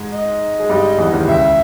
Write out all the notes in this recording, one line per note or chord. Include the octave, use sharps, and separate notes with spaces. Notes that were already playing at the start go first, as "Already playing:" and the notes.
Already playing: G#2 G#3
D#5
G#3
G2 G3
E2 E3
D#2 D#3
C#2 C#3 E5